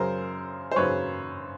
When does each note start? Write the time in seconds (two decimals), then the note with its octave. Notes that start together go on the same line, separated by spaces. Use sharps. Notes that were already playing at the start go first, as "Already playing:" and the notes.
Already playing: F#2 C#3 F#3 A#4 C5
0.71 C5
0.76 F#2 C#3 F#3 B4 C#5